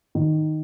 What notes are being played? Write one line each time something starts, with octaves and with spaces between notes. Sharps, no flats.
D#3